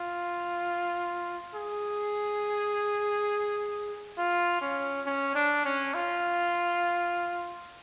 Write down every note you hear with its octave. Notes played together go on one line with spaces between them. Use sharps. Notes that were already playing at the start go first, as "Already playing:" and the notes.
Already playing: F4
G#4
F4
C#4
C#4
D4
C#4
F4